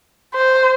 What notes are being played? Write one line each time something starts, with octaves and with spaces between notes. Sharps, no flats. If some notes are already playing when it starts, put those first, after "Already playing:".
C5